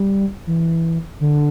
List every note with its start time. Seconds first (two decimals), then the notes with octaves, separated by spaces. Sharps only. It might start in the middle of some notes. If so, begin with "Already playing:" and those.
Already playing: G3
0.47 E3
1.20 D3